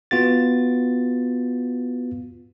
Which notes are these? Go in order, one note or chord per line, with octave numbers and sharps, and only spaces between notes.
B3 F4 F#4 A6